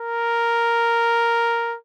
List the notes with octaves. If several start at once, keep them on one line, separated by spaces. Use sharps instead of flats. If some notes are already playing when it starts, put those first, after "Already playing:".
Already playing: A#4